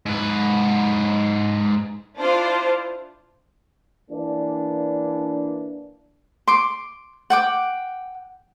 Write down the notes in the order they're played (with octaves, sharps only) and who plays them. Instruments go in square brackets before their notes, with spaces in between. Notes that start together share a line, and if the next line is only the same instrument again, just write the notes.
[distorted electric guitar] G#2 B4
[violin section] D4 E4 F4 C5
[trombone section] E3 A#3 D4
[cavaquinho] C6 D6
F#5 G5 D6